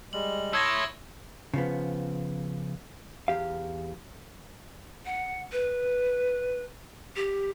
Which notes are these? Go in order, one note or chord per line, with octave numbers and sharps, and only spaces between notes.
G3 G#3 F#7
E4 A4 C#5 C6 D#6 E6 G#6 A#6
C#3 F3 B3
E2 G4 F5
F#5
B4
G4